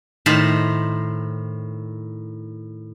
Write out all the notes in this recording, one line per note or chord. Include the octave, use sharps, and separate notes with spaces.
A2 D#3 C5 A5 B5